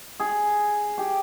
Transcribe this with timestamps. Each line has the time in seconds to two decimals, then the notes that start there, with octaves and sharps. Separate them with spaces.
0.20 G#4
0.98 G4